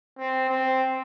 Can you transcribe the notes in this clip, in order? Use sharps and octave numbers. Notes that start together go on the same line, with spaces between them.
C4
C4